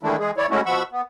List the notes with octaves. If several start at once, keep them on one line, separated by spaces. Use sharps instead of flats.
D#3 E3 G#3 A3 D4 E4
E3 G#3 G#4
E3 E4 C#5 D5
G#3 A3 C#4 E4 F#4
B2 F3 F#5 B5 C#6 E6
B3